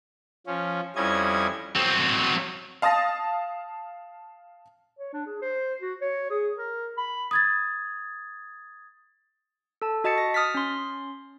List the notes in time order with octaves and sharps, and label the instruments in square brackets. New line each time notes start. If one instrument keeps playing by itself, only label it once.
[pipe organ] F3 C#4
F2 G3 C#4 E4 D#5 G#6
[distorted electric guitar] F#3 C4
[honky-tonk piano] F5 A5 D#6 A6 A#6
[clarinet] C#5
D4
G#4
C5
F#4
C#5
G#4
A#4
B5
[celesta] D#6 G#6 A6
[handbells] A4 A5
F#4 D#5 A5 A6 C#7
A#6
D#6 F6 A6 B6
C#4 C6